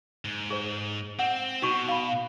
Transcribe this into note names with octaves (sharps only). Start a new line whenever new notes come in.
G#2
G#4 C5
C4 F#5
B2 D#4 F#4 C#6
F5 B5